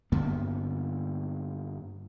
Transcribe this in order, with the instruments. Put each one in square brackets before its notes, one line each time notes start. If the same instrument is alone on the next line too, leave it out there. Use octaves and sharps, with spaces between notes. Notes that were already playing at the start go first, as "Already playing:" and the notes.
[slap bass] G2 D3 A#3 B3